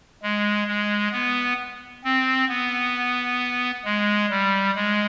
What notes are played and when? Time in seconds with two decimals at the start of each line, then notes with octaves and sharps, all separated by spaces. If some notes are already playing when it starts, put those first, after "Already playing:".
0.22 G#3
0.67 G#3
1.13 B3
2.04 C4
2.49 B3
3.85 G#3
4.30 G3
4.75 G#3